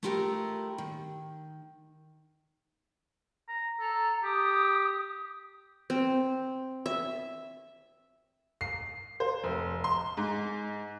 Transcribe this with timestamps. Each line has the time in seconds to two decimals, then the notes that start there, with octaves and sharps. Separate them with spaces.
0.03 A3 E4 F4 G4 A4 A#4
0.78 D#3
3.48 A#5
3.80 A4 A#5
4.23 G4 D#6
5.90 C4
6.86 E5
8.61 C7
9.20 C5
9.44 F1
9.84 C6
10.17 G#2